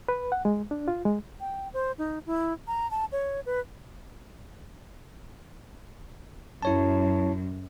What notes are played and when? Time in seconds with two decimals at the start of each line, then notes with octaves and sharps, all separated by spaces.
0.09 B4
0.32 F#5
0.45 G#3
0.71 D4
0.88 F4
1.05 G#3
1.40 G5
1.74 C5
1.98 D#4
2.26 E4
2.67 A#5
2.91 A5
3.12 C#5
3.46 B4
6.62 F#2 E4 C#5 A5